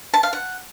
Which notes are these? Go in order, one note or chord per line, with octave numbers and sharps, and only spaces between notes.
A5
F5
F#5